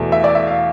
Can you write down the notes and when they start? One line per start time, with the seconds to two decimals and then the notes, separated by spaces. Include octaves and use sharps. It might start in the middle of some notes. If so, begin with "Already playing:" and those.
Already playing: E2 B2 A3
0.12 E5
0.24 D5
0.35 E5
0.47 F5